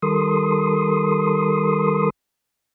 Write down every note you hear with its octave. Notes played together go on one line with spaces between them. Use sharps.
D#3 G3 A4 A#4 C6 D#6